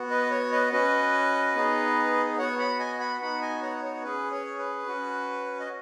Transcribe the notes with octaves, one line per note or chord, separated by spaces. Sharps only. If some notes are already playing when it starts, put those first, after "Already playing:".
Already playing: B3 F#4
B4 D#5
C#5
B4 D#5
C#4 F#4 B4 D#5
B3 D#4 G#4
B3 F#4 C#5 F#5
F#5 B5
D#5 G#5
F#5 B5
B3 D#4 F#4 F#5 B5
D#5 G#5
C#5 F#5
C#5
C#4 G#4 B4
C#5
B4
C#4 F#4
D#5